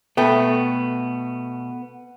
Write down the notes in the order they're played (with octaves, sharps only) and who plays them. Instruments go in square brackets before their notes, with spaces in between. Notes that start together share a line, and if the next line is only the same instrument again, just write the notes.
[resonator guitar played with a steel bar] B2 A3 [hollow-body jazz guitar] B3 G5